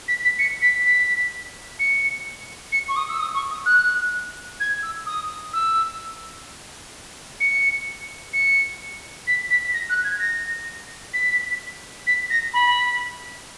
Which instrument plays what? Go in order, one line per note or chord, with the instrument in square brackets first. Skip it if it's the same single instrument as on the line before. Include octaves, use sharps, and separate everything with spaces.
[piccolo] B6
B6
C#7
B6
B6
C#7
C#7
C#6
D#6
E6
D#6
C#6
D#6
F#6
G#6
E6
D#6
E6
C#7
C#7
B6
B6
A#6
F#6
G#6
A#6
B6
B6
A#6
B5